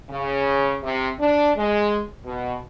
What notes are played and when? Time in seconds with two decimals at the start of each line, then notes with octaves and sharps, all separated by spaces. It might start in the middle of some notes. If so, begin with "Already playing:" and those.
0.10 C#3
0.83 C3
1.20 D4
1.56 G#3
2.25 B2